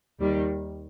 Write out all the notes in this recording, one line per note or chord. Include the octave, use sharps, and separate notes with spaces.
D#2 D#3 G3